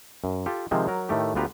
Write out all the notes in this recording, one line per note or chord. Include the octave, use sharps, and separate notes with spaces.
F#2
F4 G4 A4
C3 D#3 F3 G#3 C4
F#3 A#4
A2 D#3 A3 G4
D2 B3 F4 G4 B4 A#5